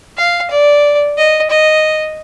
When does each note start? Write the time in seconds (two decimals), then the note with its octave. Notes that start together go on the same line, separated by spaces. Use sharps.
0.17 F5
0.51 D5
1.17 D#5
1.50 D#5